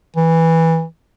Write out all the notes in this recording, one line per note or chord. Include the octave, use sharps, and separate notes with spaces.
E3